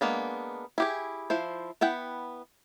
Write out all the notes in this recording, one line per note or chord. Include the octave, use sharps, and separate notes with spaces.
G#3 A#3 B3 D4
E4 G4 G#4
F3 E4 C5
B3 E4 F#5 G5